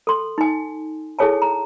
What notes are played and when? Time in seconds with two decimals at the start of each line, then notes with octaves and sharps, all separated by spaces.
0.07 A4 C6
0.38 D#4 G#5
1.19 E4 G#4 A4 C#5 G#5 A5
1.42 A#5